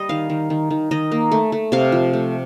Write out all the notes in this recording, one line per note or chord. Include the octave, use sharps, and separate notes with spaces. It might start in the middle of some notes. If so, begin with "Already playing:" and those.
Already playing: G3 D#5
D#3 F5
D#3
D#3
D#3
D#3 D#5
A#3
A3
A3
C3 F5
F3
A3